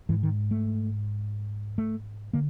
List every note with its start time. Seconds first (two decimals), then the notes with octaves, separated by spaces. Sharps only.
0.09 G#2 E3
0.23 D#3
0.51 A3
1.78 A3
2.33 D3 A#3